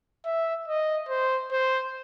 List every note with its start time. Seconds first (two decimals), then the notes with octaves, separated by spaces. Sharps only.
0.25 E5
0.68 D#5
1.09 C5
1.51 C5